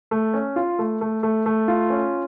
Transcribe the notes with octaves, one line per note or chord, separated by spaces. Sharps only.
A3
C#4
F4
A3
A3
A3
A3
F4
C#4